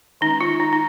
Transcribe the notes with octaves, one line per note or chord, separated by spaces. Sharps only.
D#3 G#3 C#4 D#4
F4
D#4
D#4